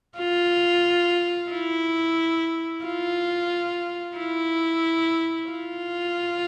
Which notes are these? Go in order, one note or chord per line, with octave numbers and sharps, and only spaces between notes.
F4
E4
F4
E4
F4